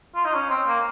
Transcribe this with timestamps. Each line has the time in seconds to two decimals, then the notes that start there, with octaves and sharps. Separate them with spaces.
0.15 F4
0.25 D#4
0.35 C#4
0.50 C4
0.68 A#3